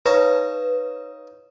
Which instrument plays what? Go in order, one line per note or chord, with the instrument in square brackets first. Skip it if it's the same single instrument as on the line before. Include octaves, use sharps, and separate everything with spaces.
[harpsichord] D#4 C#5 F5 [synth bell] B4